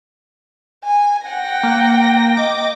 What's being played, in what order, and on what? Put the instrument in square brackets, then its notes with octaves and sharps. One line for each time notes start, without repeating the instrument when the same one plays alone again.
[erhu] G#5
[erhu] F#5 [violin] G5 A#6
[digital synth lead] A#3
[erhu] D#5 [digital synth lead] D6